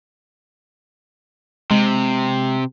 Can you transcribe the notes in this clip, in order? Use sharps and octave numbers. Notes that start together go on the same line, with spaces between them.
C3 G#3